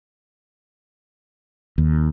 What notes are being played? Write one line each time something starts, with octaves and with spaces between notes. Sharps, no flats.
D#2